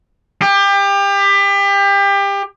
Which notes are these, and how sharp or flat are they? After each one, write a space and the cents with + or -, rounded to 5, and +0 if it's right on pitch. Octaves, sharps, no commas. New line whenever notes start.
G4 +30